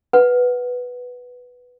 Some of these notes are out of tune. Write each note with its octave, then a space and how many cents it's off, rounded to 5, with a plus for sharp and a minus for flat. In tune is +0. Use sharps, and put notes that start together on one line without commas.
B4 +0 F#5 +0